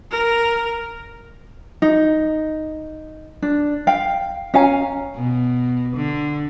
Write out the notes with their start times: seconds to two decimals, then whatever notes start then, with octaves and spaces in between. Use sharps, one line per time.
0.11 A#4
1.82 D#4
3.42 D4
3.87 F5 G5
4.54 C#4 F5 G#5 A#5
5.15 B2
5.96 D3